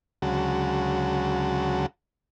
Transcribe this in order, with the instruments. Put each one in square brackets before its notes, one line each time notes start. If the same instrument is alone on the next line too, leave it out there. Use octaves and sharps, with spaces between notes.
[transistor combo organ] D2 C#3 F#3 G#3 F#4 A5